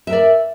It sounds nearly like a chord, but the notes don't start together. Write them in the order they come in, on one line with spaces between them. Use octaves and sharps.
E5 A#4 D5